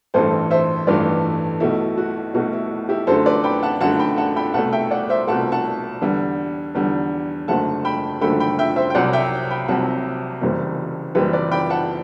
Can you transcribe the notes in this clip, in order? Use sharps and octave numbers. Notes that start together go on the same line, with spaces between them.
A1 G2 E3 A3 A4 C5
C5 E5
A1 G2 E3 A3 B4 D5
B1 B2 A3 E4
F#4
B1 B2 A3 F#4
E4
E4 G4
F#2 D3 A3 A4 C5
B4 D5
G5 B5
F#5 A5
F#2 D3 A3 F#5 A5
G5 B5
F#5 A5
G5 B5
C2 B2 A3 F#5 A5
E5 G5
D5 F#5
C5 E5
C2 B2 A3 F#5 A5
F#5 A5
E2 D3 G3
E2 D3 G3
F#1 F#2 D3 A3 F#5 A5
G5 B5
F#1 F#2 D3 A3 G5 B5
G5 B5
E5 G5
C5 E5
G5
C2 C3 F#3 D5 F#5
E5 G5
G5 B5
C2 C3 F#3 F#5 A5
F#1 F#2 E3 G3
F#1 F#2 E3 G3 G4 B4
B4 D5
G5 B5
F#5 A5